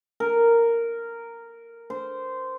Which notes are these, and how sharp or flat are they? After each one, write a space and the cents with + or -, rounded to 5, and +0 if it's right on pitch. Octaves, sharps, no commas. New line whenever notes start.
A#4 -10
C5 -15